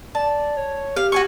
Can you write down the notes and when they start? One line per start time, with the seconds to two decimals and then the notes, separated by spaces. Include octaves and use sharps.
0.15 D5 A5
0.57 C#5
0.96 G4 F5
1.12 F#4 G#5 C#6